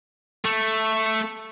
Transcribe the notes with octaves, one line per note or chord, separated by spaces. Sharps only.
A3